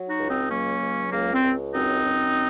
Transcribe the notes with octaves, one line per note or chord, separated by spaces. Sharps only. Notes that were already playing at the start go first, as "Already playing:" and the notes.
Already playing: F#3
D#4 F#4
C#2
C4 D#4
F#3 A#3 C#4
C#2
C#2 A#3
C4
C#2
F#2 C4 D#4
F#2